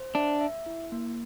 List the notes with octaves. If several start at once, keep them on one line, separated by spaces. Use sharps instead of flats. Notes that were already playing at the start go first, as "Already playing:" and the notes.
Already playing: C5
D4 E5
E5
E4
A#3